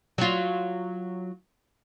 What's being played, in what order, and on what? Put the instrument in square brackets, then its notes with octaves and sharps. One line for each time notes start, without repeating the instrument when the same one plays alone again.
[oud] F#3 F4